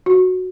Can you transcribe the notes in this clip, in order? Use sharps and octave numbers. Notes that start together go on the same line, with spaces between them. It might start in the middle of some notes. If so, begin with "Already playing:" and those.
F#4